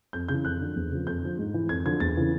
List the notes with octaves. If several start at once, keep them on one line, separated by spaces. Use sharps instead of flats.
F2 G6
C#3 E3 G6
F2 F#6
D3 F3
E2
C#3 F3
F2 G6
D3 F3
G#2
E3
F2 G#6
D3 F3 G#6
E2 A6
C#3 E3